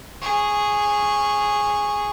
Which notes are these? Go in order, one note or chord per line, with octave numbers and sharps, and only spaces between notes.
G#4 C#6